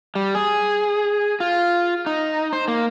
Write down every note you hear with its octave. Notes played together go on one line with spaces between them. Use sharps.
G3
G#4
F4
D#4
C5
A#3